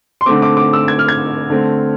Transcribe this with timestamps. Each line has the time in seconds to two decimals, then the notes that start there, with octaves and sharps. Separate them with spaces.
0.21 C6
0.26 D3 A3 C4 D6
0.42 D6
0.57 D6
0.73 E6
0.88 G#6
0.99 F6
1.08 G#6
1.50 D3 A3 C4